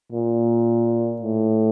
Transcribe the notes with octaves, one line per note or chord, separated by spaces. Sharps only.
A#2
A2